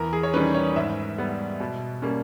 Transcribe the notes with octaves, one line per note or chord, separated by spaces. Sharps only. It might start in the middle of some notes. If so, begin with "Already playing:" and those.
Already playing: E2 A#4
G#4
C#5
D#3 G3 C#4 B4
C#5
G#2 E5
G3 B3
B2
G3 A#3 C#4